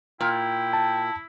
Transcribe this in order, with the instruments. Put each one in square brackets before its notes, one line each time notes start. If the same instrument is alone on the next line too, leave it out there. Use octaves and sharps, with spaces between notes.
[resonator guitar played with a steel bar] A#2 [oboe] E4 [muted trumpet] G5
[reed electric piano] A5